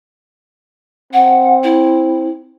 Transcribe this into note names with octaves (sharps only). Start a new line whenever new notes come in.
C4 F#5
E4